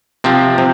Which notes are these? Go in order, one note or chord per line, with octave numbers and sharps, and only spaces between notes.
C3 F3 C4
C3